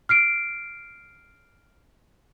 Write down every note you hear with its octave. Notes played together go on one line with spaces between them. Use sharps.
F6 C7 D7